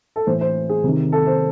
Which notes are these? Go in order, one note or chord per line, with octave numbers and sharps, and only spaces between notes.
A4
A2 E3 C5
C5
G#4
C3 D#3
A4
C5